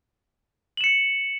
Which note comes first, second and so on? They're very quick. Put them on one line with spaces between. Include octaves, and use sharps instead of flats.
F#7 E7 C#7